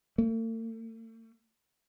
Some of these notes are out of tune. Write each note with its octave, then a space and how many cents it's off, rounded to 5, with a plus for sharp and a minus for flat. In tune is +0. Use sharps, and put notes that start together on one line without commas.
A3 +45